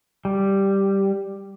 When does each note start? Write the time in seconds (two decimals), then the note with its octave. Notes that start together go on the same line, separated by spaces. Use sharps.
0.25 G3